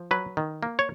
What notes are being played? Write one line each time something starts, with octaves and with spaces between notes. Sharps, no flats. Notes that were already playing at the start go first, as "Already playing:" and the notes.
Already playing: F3
F#3 B4
D#3
A#3
C#5